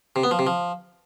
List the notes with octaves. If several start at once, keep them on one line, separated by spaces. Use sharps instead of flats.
C3
B3
F3
C3
F3